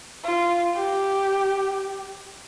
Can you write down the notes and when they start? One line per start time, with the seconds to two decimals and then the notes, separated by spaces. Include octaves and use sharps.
0.24 F4
0.75 G4